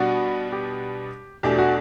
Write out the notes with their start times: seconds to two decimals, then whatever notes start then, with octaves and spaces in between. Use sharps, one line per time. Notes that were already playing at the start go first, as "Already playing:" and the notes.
Already playing: B2 G3 B3 D4 F#4
0.52 G4
1.43 E2 B2 A3 D4 G4
1.58 F#4